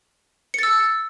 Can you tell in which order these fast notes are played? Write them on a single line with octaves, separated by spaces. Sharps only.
C#7 A6 E6